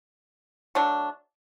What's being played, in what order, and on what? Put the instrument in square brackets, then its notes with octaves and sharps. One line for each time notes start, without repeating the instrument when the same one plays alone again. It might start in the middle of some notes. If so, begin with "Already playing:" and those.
[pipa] F#3 A3 D4